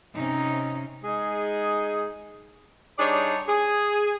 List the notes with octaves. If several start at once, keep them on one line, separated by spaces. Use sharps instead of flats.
C3 C#4 D#4
G#3 D#4 G#4
G3 D4 D#4 G#4 C#5 D5
G#4